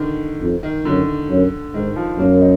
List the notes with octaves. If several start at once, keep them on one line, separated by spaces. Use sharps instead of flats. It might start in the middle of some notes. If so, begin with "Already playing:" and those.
Already playing: D3 D#3
F2
D#3
F#2 D3
F#2
G#2 D#3
F3
F#2 A#3
D#4